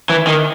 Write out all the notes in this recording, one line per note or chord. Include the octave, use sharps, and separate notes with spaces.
E3
D#3